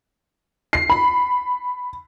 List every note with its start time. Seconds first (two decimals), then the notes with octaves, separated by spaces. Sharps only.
0.73 C7
0.90 B5